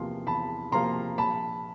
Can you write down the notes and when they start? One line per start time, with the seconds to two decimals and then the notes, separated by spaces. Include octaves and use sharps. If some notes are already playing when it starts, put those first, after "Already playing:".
Already playing: E2 C3 F3 A#3 C6
0.27 E2 A5 B5
0.72 C3 F3 A#3 A#5 C6
1.18 A#1 A5 B5